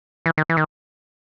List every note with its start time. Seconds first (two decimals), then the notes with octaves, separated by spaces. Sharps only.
0.26 E3
0.38 D#3
0.50 E3
0.57 D#3